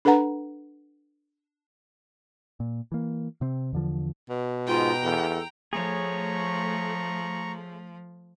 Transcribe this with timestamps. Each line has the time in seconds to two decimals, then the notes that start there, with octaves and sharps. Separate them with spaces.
0.05 D4 A4 B4 F#5 A#5
2.60 A#2
2.92 E3 A#3
3.41 C3 C4
3.73 E2 D3 F3
4.30 B2
4.67 G#2 F4 G5 A#5
5.03 E2 A4
5.73 F3 A3 G#4 C#5 A#5 C#6